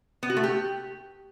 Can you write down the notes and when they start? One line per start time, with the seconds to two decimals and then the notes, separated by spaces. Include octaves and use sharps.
0.23 B3
0.30 F#4
0.37 A3
0.44 G4